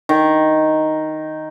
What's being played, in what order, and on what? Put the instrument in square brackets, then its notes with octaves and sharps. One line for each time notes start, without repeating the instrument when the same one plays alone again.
[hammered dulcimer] D#3